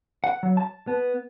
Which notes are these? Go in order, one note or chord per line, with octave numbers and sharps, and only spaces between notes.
F#5
F#3
A5
B3